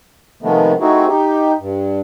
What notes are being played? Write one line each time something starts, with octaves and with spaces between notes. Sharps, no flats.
C3 D#3 F3 G#3 A3 B3
A3 C4 D#4 E4 F#4 G#4
D#4 G4
G2